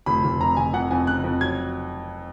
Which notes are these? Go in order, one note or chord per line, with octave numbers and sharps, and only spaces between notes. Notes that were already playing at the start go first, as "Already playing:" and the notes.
F1 B5
F1
F2 A#5
F1 G#5
F2 F#5
F2 G#5
C#3 F#6
F2
F#3 G#6